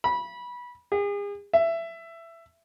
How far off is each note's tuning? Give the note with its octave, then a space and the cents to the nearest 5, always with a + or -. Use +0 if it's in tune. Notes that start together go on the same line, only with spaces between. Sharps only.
B5 -20
G#4 -40
E5 +15